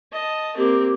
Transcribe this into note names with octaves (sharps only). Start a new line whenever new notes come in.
D#5 A5
A#3 C4 G4